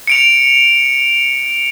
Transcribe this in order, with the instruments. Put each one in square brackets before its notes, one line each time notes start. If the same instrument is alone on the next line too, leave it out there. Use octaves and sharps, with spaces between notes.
[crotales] C#7 D7 F7